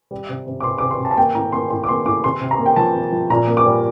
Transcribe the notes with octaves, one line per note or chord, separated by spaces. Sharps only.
G3
C3
C3
D6
C3 C6
C3 D6
C6
C3 A5
A5
A#3 G5
A2 A#5
A#3 C6
A2 C6
D6
A#3 C6
A2 D6
C3 C6
C3
A#5
A#3
G5
F3 A5
C3
F3
A#2 A#5
A#3
D6
G3